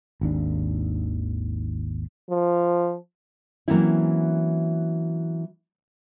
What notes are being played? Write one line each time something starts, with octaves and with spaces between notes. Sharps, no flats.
G#1 D#2 D4
F3
E3 F#3 A#3 C4 C#4 E4